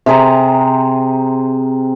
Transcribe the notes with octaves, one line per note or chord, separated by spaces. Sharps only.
C3 G#4 C5 A#5